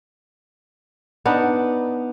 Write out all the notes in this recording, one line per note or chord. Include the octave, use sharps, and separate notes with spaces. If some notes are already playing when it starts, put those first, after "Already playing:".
B3 D4 D#4